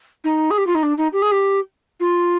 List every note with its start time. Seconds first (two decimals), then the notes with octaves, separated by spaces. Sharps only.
0.24 D#4
0.50 G#4
0.57 G4
0.66 F4
0.74 D#4
0.82 D4
0.97 D#4
1.12 G4
1.22 G#4
1.31 G4
2.00 F4